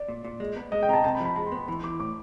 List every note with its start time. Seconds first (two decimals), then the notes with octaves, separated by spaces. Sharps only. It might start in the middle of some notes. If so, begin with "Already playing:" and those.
Already playing: D5
0.08 A#2
0.24 A#2
0.40 G#3
0.56 B3
0.72 G#3 D#5
0.83 G5
0.89 C3 A#5
0.93 A5
1.04 C3 A5
1.15 B5
1.20 F3
1.25 B5
1.36 G#3 B5
1.47 C6
1.52 B3
1.57 B5
1.68 E3 B5
1.83 E3 D6
2.00 A2 D6